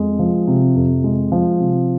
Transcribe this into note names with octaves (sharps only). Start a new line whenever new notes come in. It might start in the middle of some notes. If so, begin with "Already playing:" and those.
Already playing: F2 G#3
F3
C3
F2
G#3
F3
C3